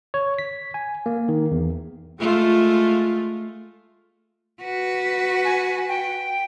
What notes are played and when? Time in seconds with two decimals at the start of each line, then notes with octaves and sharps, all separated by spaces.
0.14 C#5
0.39 B6
0.74 G#5
1.06 A#3
1.29 D#3
1.52 E2
2.19 G#3 A3 F4
4.61 F#4 B4
5.45 G#5
5.88 G5